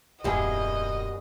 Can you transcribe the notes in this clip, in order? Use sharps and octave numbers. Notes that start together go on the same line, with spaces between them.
D#1 F#2 G3 B3 E4 G#4 D#5